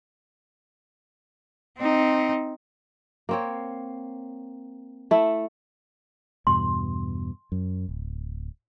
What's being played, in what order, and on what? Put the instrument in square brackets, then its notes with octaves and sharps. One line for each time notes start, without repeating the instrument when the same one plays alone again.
[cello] C4 D#4
[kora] A#3 C4 C#5
A3 E4
[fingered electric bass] E2 G2 B2 [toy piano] C6
[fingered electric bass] F#2
D1